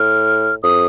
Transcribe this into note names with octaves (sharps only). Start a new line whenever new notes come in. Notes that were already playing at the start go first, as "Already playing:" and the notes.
Already playing: A2 F6
F2 D#6